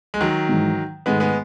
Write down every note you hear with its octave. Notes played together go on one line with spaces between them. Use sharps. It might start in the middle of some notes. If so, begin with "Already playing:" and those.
G#3
D#3 F#3
G#2 E3 G#3
G#2 D#3 G#3 A3 B3 D#4
G#3 B3